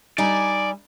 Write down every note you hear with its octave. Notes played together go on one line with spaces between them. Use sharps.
G3 D#4 D5 G#5